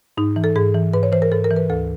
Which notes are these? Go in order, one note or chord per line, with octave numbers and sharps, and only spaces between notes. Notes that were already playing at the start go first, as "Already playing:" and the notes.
G#2 D#4
E3
A4
G#2 G#4
E3
G#2 B4
C#5
E3 C5
A#4
G#2 A4
A#4
E3
B4
D2 A4